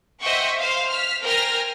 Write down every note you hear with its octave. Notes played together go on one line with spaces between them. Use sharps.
C5 D#5 E5 F#5 G5 C#6
C5 F5
F6 B6
A#4 C5 G5 G#5 F6 A#6